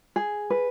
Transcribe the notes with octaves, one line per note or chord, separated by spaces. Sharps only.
G#4
B4